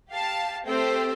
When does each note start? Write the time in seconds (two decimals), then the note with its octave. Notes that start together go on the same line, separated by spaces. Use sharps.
0.10 G4 F5 A5
0.66 A3 C4 G4 A4 C5 G5